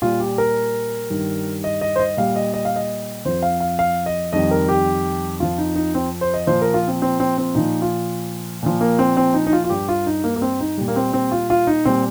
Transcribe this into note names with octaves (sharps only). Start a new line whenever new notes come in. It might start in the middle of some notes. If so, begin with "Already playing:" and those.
A#2 G3 F4
G4
A#4
G2 D#3 G3
D#5
D#5
C5
D#5
A#2 G3 F5
D#5
D#5
F5
D#5
F2 F3 C5
F5
F5
F5
D#5
F2 D#3 G3 D#5
A#4
G4
F2 F3 F4
D#4
D#4
C4
C5
D#5
A#2 F3 C5
A#4
F4
C4
C4
C4
C4
A#2 F3 D#4
F4
A#2 F3
A#3
C4
C4
D#4
D#4
F4
F4
G2 G3 G4
F4
D#4
A#3
A#3
C4
D#4
A#2 G3
A#3
C4
C4
F4
F4
D#4
A#2 G3 C4